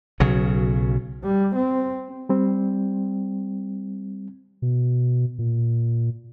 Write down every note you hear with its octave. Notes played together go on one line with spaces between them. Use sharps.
B1 C#3 F#3
G3
C4
G3 C4
B2
A#2